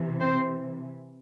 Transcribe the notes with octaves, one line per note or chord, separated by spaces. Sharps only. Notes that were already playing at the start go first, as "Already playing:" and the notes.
Already playing: C3 E3
C4 C5